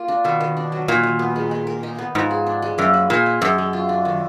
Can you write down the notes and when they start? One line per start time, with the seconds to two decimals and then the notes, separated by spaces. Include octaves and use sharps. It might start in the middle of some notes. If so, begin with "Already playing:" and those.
Already playing: A#3 F4
0.08 D4
0.24 B2 D#3
0.41 D#3
0.57 D4
0.72 F#3
0.88 A#2 D#3
1.03 D#3
1.19 B3
1.36 G#3
1.51 G#3
1.67 A#4
1.83 D#4
1.99 B3
2.15 G#2 F3
2.31 G#4
2.47 D4
2.62 G#3
2.78 F#2 A#3
2.94 B4
3.10 A#2 G#4
3.26 D#4
3.41 F#2 G#3
3.58 G#3
3.73 F4
3.89 D4
4.05 D#3